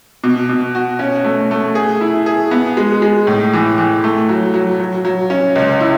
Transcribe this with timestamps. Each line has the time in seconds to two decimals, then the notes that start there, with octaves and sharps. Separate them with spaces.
0.24 B2
0.49 B2
0.75 F#4
0.99 C#4
1.25 A3
1.51 A3
1.75 G#4
2.01 E4
2.26 G#4
2.51 B3
2.77 G#3
3.02 G#3
3.27 A2
3.53 E3
3.78 E3
4.04 A3
4.29 F#3
4.54 F#3
4.80 F#3
5.05 F#3
5.30 C#4
5.55 C#2
5.80 E4